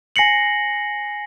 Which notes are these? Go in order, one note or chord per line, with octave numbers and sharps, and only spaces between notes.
G#5 A#6 C7 C#7 F#7